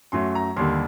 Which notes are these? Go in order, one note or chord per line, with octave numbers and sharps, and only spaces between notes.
F#2 F#3 A3 C6
A#5
D#2 D3 G3 A#3 C6